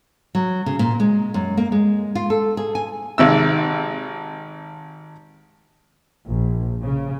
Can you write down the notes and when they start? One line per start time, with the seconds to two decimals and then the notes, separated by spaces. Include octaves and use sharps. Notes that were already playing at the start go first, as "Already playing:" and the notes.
0.35 F#3
0.66 C#3
0.79 A#2
1.00 G#3
1.34 F#2
1.57 A#3
1.72 G#3
2.15 F4
2.30 A4
2.57 G#4
2.75 G#5
3.18 G#1 C3 E6
6.28 A#1
6.83 C#3